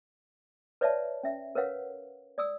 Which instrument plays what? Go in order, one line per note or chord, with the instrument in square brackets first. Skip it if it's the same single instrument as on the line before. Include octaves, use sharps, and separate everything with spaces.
[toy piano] B4 C#5 D5 E5 F5 A5
C#4 E5
A#4 B4 C#5 F5 F#5
D5 D#6 E6